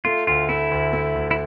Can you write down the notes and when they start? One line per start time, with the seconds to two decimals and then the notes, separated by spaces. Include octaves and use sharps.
0.05 A3 F4
0.27 D2 F4
0.49 A3 E4
0.71 D2
0.93 A3
1.15 D2
1.31 E4